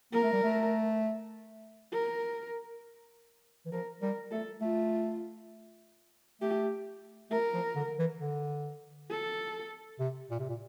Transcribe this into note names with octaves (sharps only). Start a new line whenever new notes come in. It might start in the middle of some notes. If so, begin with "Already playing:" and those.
A#3 A#4
A3
G3
A3
A#4
E3
F3 A#4
G3 A#4
A3 A4
A3 F4
A3 G4
A3 A#4
F3
D3
E3
D3
A4
C3
A#2
C3
A#2